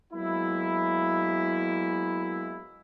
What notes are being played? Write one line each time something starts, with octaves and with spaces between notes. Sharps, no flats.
F#3 G#3 A#3 B3 E4